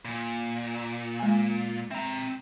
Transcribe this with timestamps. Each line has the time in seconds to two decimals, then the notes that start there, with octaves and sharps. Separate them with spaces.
0.05 A#2
1.19 G#3 G#5
1.91 C4 E5 A#5